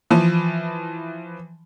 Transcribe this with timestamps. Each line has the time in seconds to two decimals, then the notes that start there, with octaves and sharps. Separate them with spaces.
0.11 E3 F3